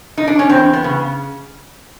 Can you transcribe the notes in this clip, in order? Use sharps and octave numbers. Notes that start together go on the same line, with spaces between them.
D#4
D4
C#4
E2 C4
B3
C#3